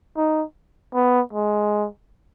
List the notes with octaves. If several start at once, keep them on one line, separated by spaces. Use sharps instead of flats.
D#4
B3
G#3